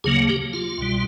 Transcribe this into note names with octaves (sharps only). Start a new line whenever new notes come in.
D2 C#3 F#3 A#3 G#4
G4
F4
C2 B2 G3